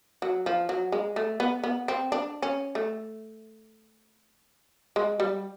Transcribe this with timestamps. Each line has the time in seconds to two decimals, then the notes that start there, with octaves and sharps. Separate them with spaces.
0.22 F#3
0.46 F3
0.69 F#3
0.92 G#3
1.16 A3
1.40 B3
1.64 B3
1.88 C4
2.12 D4
2.42 C#4
2.75 A3
4.96 G#3
5.20 G3